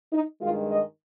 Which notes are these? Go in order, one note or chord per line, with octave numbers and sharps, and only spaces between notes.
D#4
G2 D#3 G#3 F4
D#5